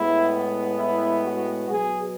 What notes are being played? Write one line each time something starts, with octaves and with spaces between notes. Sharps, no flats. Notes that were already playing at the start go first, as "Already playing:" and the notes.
Already playing: A2 G#3 B3 E4
E4
F#4
B2 F#3 B3 G#4